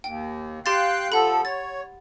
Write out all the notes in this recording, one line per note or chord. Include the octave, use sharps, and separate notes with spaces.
D#2 G5
G4 F5 G5 C6 F#6 A6
F3 A4 F#5 B5
C#5 A6